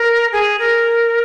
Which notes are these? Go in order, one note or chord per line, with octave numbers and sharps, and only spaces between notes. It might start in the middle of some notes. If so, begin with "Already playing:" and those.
Already playing: A#4
G#4
A#4